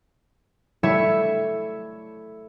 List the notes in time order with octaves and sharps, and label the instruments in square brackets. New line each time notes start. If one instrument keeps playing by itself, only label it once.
[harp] G3 A3 E4 C#5 E5